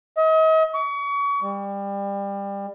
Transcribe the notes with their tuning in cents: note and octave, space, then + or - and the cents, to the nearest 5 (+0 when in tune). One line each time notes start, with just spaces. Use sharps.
D#5 +40
C#6 +35
G3 +25